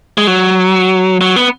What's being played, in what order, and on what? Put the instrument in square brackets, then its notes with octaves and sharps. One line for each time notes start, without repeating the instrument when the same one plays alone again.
[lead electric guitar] G#3
F#3
F#3
B3